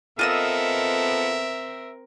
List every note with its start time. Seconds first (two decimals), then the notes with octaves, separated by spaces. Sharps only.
0.19 B3 C4 F4 A4 A#4 D#5 E5 E6